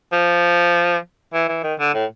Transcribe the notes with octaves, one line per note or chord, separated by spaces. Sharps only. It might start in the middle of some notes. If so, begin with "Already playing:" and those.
F3
E3
E3
D#3
D3
A2